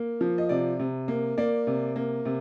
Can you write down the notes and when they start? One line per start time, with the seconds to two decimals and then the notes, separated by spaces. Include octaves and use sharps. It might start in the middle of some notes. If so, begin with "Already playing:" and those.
Already playing: A#3
0.21 F3
0.38 D#5
0.49 C3 D5
0.79 C3
1.08 A#3
1.38 A#3 D5
1.67 C3
1.96 A#3
2.25 C3